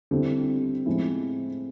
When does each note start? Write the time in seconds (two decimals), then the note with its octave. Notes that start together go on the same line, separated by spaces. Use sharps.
0.11 D3 G3 C4 E4
0.86 A2 F3 G#3 C4 E4